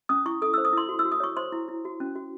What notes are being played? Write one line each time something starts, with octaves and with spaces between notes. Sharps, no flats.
C#4 D#6
E4 C#6
A4 D#6
C5 E6
D#6
E4 C6
F#4
E6
F#4
D#6
C#5 C#6
C5 C6
E4
E4
F#4
C#4
F#4